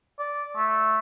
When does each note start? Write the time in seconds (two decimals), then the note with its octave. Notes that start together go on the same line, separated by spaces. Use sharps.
0.19 D5
0.56 A3